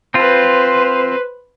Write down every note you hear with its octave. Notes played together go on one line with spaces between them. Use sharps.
C4 F4 B4 C5